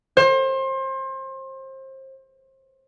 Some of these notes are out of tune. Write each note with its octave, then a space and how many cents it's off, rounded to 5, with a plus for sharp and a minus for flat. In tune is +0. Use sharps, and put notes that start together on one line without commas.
C5 +30